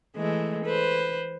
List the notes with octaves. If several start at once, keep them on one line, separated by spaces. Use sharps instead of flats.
E3 G#3 A3
B4 C5